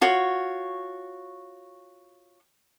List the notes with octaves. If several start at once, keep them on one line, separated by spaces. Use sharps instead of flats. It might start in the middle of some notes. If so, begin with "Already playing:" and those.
F4 F#4 C#5